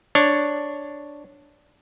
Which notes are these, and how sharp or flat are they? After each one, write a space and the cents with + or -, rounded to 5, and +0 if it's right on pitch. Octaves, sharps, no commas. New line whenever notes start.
D4 +0 C#5 +0